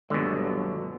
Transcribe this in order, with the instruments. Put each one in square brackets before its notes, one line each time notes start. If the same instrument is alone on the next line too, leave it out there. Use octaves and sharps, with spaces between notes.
[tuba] G1 [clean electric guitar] D#2 G#3 [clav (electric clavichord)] B2 D3 [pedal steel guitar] F#3